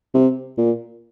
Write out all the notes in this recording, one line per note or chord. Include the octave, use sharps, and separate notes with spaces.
C3
A#2